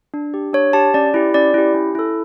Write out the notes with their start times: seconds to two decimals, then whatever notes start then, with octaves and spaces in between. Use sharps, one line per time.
0.14 D4
0.34 G4
0.53 D4 C#5
0.73 G4 A5
0.94 C#4 D5
1.14 E4 G4
1.34 C#4 D5
1.54 E4 G4
1.74 C#4
1.95 E4 A4